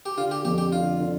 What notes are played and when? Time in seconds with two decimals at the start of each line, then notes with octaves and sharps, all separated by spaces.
0.06 G4
0.17 D3 F4
0.31 G4
0.45 F2 G4
0.58 G4
0.72 D3 F4
1.00 D3